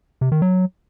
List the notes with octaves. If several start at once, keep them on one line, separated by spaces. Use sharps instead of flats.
C3
D#3
F#3